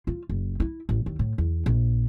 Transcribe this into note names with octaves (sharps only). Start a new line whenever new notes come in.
F4
F#1
E4
A1
D#2
A2
E2
A#1